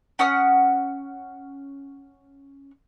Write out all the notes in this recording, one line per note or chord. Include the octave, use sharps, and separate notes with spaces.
C#4 F#5 D#6 F6